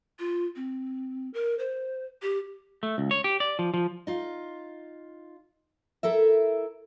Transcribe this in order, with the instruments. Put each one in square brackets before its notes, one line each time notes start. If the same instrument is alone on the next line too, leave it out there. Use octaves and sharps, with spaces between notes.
[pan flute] F4
C4
A#4
C5
G4
[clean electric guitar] A3
C#2
C#5
G4
D5
F3
F3
[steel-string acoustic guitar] D#4 F4
E4 A4 A#4 E5